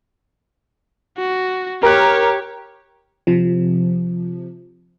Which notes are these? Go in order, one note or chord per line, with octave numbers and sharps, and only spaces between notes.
F#4
G4 A#4 C#5 F#6
C3 F3